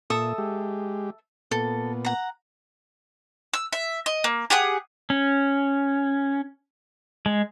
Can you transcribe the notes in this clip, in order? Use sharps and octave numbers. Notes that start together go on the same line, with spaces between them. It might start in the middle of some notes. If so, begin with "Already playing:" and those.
A#2 A4 E5 D#6
G#3 G4
A#2 B3 A4
F#5 A#5
E6
E5
D#5
A#3
G4 G#4 F#5 D#6
C#4
G#3